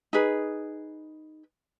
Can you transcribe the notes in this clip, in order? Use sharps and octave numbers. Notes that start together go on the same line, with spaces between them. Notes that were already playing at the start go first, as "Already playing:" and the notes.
D#4 G#4 B4